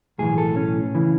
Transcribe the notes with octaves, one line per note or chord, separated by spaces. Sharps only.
B1 A2 E3 G#4
A4
C#4
C#3 E3